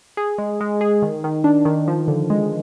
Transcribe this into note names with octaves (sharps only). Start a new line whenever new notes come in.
G#4
G#3
G#3
G#4
D#3
D#3
D4
D#3
F3
D3
G#3